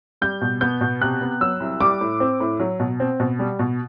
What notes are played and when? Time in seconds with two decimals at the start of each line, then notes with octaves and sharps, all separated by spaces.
0.21 G3 G6
0.42 B2
0.61 B3 G6
0.81 B2
1.01 C3 F#6
1.21 B3
1.41 F#3 E6
1.60 C2
1.80 G3 D6
2.01 A2
2.20 C4
2.40 A2
2.60 F#3
2.80 B2
3.00 C4
3.20 B2
3.39 G3
3.59 B2